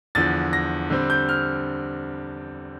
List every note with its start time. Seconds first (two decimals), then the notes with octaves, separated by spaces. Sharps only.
0.15 E2 D3 F3 A6
0.53 A#6
0.90 D3 G3 C4
1.10 G6
1.29 F6